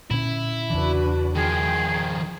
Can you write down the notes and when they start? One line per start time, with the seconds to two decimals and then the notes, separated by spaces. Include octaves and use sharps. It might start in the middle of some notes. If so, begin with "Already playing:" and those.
0.11 A#2 D3 C#4 E4
0.70 E2 C#3 E3 D4 F#4 B4
1.35 D#3 F3 G#4 G5